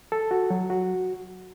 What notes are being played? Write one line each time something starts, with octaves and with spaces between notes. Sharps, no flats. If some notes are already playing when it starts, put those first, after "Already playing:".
A4
F#4
F#3
F#4